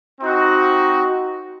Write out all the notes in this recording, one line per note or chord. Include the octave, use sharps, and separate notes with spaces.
C4 D#4 F#4